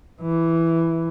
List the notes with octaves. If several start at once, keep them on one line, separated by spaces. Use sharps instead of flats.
E3